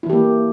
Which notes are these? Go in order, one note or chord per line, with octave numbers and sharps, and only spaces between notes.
E3 A#3 E4 G4